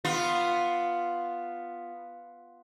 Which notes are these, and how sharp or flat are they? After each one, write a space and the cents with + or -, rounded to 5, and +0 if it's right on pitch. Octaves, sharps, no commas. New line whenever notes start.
B3 +0 F4 +0